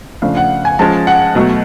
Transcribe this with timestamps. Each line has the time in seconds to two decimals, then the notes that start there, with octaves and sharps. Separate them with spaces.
0.22 C#3 F3 A3 D4 F5
0.37 F#5
0.65 G#5
0.79 F3 G#3 C#4 A5
1.07 F#5
1.35 B2 F#3 A3